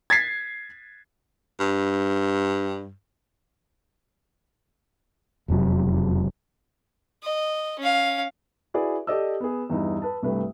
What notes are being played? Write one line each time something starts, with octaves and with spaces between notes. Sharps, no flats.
G#6 A6 B6 C7
G2
E1 F2 C3 F#3
D#5
C#4 F5
E4 F#4 G#4 B4 D5
G4 A4 D5 D#5 D#6 E6
B3 G#4
E2 G2 D#4 E4
B4 A5
C2 G2 A3 B4